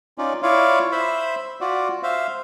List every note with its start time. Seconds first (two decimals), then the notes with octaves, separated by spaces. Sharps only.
0.18 C#4 D#4 F4 D5
0.43 E4 F4 C#5 D5 F5
0.92 C5 E5 B5
1.61 F4 F#4 D5
2.03 C5 E5 F5